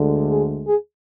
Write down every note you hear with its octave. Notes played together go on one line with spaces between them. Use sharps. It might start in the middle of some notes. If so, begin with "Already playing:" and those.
Already playing: D2 D3 G#3
G#4
G#4